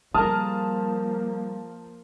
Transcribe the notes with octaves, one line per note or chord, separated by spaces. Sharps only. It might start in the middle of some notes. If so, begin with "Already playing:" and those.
F3 G3 A#3 G#4 A#4 A5 D#6 F6